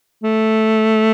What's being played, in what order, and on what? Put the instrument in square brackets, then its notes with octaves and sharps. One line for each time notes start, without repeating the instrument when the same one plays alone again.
[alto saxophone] A3